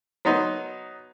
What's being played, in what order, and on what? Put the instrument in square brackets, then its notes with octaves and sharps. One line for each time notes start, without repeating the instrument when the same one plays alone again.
[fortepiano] F#3 B3 D#4 C6